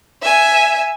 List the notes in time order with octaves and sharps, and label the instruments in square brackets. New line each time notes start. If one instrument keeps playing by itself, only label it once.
[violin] E5 G#5